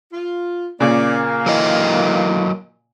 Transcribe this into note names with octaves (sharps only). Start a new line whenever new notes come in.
F4
A#2 C#3 A#3 C#4 D5
D3 E3 F#3 A#4 D#5